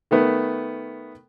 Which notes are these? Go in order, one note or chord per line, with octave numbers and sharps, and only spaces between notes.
D#3 A3 B3